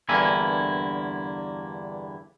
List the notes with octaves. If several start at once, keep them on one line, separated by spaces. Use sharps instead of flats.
E2 G2 D3 A#3 E4 G#5